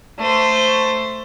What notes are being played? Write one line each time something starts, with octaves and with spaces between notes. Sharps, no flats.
A3 C5